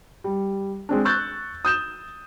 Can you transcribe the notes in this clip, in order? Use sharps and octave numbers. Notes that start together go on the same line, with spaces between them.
G3
G#3 C4 D4
C#6 E6 F#6 G6 A6
D#6 G6 E7